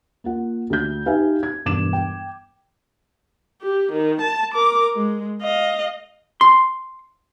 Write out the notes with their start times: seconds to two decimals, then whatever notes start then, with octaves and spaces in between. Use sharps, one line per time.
0.24 A#3 F4 F#5
0.70 D2 A3 G6
1.06 D#4 G4 B4 E5 F5 G#5
1.43 G#6
1.65 E1 G2 D6 E7
1.93 G5
3.61 G4
3.92 D#3
4.21 A5
4.54 A#4 D6
4.96 G#3
5.42 D#5 F5
6.41 C6